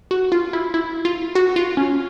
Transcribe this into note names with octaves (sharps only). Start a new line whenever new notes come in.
F#4
F4
E4
E4
F4
F#4
F4
C#4